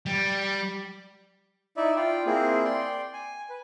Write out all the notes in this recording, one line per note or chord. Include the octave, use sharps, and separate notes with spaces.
G3
D#4 E4 D5 E5
F4 D5 G5
A#3 C4 E4 G#4
D5 G5 C6
G#5
B4